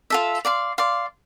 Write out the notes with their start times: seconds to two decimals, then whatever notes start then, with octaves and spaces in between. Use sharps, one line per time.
0.10 F4 A4 E5
0.45 D5 F5 C6
0.78 D5 F5 C6